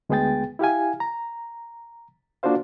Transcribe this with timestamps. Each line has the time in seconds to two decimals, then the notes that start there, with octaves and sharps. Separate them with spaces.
0.09 D2 G#3 B3 G#4 G5 A6
0.59 E4 G4 F5 G#5
1.00 A#5
2.43 A#3 D4 F4 F#4 C5 F5